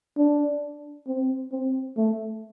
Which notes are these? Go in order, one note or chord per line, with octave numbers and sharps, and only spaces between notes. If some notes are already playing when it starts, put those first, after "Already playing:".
D4
C4
C4
A3